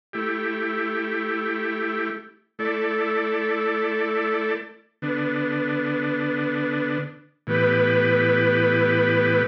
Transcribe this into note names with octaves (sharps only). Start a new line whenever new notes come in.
A3 E4 G4
A3 E4 A4 D5
D3 B3 D4
A2 E3 B3 G4 B4